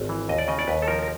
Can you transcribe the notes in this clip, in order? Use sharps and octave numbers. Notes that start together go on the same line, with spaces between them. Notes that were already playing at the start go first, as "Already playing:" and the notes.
Already playing: G#1
E3
D#2 D#5
D5
C#3 D#5
D5
D#2 B4
A4
F3 A#4
A#4